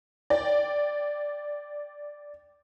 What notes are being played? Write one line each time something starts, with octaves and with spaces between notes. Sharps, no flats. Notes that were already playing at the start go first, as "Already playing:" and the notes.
D5 G5